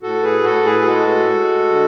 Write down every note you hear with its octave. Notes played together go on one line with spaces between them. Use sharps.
A2 F#4 A4
G#4 B4
A2 F#4 A4
G#4 B4
G#4
G#3 F#4 A4
G#3
D3